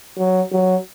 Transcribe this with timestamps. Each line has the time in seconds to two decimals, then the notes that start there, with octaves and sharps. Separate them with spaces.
0.18 F#3
0.52 F#3